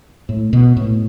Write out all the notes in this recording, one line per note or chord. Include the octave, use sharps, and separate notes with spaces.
A2
B2
A2